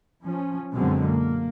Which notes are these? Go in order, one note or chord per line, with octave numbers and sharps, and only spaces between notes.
F3 C#4
F#2 B2 D3 F#3 G#3 C4
A#3